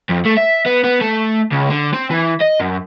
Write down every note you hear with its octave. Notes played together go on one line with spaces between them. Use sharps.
F2
A3
E5
B3
B3
A3
C#2
D3
C4
E3
D#5
F#2